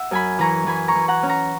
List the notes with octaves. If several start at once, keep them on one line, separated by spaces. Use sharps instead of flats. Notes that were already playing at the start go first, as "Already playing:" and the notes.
Already playing: E5 F#5
F#2 G#5 B5
E3 A#5 C#6
E3 G#5 B5
A#5 C#6
E3
F#5 A#5
C#4
A#5 C#6